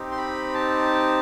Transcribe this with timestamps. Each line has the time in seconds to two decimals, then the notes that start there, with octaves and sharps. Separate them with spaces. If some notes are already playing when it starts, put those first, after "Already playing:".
Already playing: C4 D#4 G4
0.11 C6
0.17 B5
0.54 A5